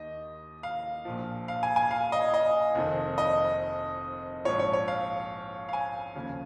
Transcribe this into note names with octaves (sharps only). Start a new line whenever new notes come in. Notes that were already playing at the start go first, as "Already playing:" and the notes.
Already playing: D#2 D#3 D#5
F5
A#1 A#2 F3
F5
G#5
G#5
F5
D#5
D#5
F1 F2 D#3
D#5
A#1 G#2 F3 C#5
C#5
C#5
F5
F5
G#5
F1 D#2 C#3 F3